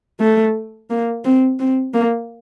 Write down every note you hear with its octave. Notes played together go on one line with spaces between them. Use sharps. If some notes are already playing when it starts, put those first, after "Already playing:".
A3
A#3
C4
C4
A#3